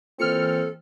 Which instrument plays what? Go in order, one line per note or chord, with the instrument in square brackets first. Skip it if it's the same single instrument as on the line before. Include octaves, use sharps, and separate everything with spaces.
[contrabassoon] A#2 [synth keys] E3 F6 C#7 [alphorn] C4 [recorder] A4